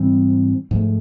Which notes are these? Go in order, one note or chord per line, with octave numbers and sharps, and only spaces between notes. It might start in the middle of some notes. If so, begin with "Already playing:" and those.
Already playing: G#2 E3 G3 C4
G#2 F3 A3